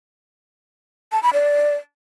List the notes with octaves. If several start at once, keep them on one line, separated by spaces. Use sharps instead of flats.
A5
B5
D5